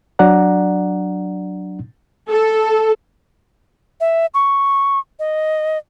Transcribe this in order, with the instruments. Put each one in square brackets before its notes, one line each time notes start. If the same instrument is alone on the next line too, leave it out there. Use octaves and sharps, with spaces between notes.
[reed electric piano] F#3 D4 D5 F#5 A#5
[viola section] A4
[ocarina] E5
C#6
D#5